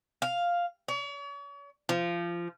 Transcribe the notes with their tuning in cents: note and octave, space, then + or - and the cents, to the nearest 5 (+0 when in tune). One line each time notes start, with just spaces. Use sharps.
F5 +0
C#5 +40
F3 -20